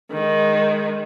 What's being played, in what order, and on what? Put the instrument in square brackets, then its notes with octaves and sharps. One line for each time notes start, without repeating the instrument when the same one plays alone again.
[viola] D#3 G#3